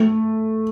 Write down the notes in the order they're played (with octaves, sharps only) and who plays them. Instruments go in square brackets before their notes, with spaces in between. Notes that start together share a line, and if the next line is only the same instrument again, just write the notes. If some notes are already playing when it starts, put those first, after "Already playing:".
Already playing: [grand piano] A3